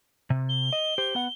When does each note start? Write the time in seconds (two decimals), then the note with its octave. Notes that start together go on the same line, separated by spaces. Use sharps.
0.30 C3
0.49 G7
0.73 D#5
0.98 G4 C5
1.15 B3 F#5